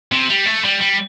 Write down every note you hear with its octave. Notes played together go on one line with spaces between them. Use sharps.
C3
G3
A3
G3
G3